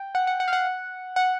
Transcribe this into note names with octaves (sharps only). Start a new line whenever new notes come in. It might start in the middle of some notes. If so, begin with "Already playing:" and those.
Already playing: G5
F#5
F#5
F#5
F5
F#5
F#5